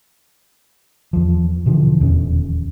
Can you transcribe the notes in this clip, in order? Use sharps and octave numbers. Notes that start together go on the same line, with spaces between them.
E2 F3
B2 D3 E3 F3
D#1 E2 C#4